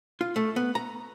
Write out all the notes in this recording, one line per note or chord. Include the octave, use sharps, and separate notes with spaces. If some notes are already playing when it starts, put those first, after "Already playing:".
F4
A3
B3
A#5